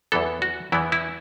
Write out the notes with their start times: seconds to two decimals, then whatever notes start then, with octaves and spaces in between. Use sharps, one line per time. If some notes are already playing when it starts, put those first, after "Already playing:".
0.12 E2 E3 B3 A4
0.42 F#4
0.72 E2 E3 B3 E4
0.92 E4